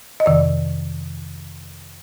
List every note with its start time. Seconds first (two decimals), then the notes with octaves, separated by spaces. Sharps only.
0.20 D#5
0.26 F2 C3 D#3 D5